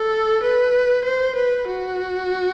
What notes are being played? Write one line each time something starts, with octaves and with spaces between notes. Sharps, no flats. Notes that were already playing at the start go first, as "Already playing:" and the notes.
Already playing: A4
B4
C5
B4
F#4